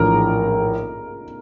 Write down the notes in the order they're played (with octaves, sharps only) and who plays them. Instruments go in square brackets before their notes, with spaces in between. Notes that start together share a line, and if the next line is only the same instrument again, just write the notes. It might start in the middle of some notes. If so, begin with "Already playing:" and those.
Already playing: [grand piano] A#1 A2 E3 [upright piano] A#4